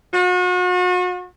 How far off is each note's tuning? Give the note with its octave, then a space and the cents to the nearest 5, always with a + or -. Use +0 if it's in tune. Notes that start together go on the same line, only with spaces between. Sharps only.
F#4 -40